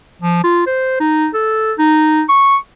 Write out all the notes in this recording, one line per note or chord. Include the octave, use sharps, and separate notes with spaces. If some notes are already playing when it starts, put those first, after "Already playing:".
F3
F4
C5
D#4
A4
D#4
C#6